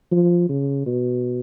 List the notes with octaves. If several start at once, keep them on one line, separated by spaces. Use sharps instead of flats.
F3
C#3
B2